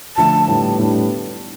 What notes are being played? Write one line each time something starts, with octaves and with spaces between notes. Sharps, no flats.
D3 F3 A3 D4 A5
A2 G3 B3 D4
A2 G3 B3 D4